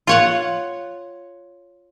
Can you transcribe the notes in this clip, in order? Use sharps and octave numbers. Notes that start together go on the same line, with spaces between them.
F4 C#5 F#5